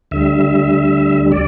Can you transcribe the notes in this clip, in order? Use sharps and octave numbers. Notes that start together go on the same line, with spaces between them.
D2 D3 G3 E5
D5